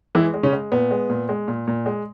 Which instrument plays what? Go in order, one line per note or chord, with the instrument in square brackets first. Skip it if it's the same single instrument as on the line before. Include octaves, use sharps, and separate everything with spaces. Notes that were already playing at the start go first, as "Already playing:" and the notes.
[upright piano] E3 G#3 E4
G#3
C#3 C#4
G#3
A#2 B3
G#3
A#2
G#3
A#2
A#2
G#3